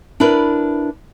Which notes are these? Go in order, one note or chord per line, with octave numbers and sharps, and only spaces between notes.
D4 E4 A#4 B4